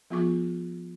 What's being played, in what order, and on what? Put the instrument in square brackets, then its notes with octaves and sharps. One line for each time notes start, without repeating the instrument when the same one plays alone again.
[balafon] F3 B3 F4 G#4 C#6 D6